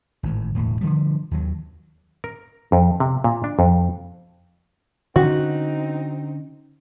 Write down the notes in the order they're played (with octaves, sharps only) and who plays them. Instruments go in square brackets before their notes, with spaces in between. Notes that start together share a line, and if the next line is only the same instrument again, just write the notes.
[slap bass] G#1 A2
E1 D2 A2
D3 D#3 F3 G3
D#2 F#3
[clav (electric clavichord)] A#4
F2
C3
A#2
D4
F2
[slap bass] D3 C#4 [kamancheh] C4 D#4 [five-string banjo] F#4